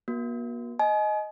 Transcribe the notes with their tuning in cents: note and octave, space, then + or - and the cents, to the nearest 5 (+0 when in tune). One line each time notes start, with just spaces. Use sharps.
A#3 +45 F#4 -15
D#5 +0 G#5 +35